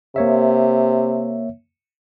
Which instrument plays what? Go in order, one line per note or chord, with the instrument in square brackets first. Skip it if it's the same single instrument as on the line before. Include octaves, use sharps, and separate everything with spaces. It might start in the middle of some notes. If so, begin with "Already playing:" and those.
[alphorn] C3 [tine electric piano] A#3 C#5 E5